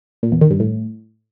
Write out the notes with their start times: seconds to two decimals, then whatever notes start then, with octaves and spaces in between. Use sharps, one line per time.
0.23 A#2
0.32 E2
0.41 D#3
0.51 G2
0.60 A2